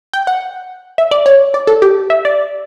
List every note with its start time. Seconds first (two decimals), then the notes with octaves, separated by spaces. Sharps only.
0.13 G5
0.27 F#5
0.98 E5
1.11 D5
1.26 C#5
1.54 D5
1.67 A4
1.82 G4
2.10 E5
2.25 D5